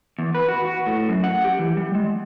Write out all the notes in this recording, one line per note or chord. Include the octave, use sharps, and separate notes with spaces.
E2
B4
F#4
F#4
A2
F#2
F#5
G4
E3
G3
G#3